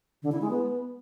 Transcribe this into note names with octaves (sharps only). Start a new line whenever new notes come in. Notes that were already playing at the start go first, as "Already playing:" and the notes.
D3
E4
G#3
B3